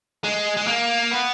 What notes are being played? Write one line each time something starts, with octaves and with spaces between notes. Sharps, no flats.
G#3
G#3
A#3
B3